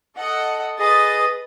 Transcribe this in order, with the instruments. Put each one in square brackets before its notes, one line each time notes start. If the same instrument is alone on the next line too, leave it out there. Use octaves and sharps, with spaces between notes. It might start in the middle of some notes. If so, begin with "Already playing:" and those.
[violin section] A4 D#5 F#5
[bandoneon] G#4 D#5 [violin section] B4 D#6 A6